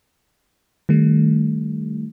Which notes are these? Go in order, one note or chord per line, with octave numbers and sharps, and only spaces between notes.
D#3 G3 A3